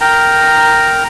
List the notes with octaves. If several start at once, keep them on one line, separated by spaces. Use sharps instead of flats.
A#4 G5 A#5